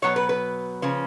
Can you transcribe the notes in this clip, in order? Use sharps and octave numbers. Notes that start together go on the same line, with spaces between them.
B2 F#3 B3 C#5
B4
B4
C#3 F3 A#3 C#4